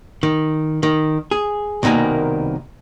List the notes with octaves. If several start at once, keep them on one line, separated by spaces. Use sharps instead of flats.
D#3
D#3
G#4
C2 B2 D#3 A#3 G#5